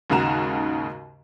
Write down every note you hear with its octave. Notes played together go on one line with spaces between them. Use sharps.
D#2 G#2 C#3 F#4 A#5 E7